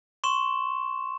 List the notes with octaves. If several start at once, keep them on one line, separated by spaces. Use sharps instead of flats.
C6 C#6 E7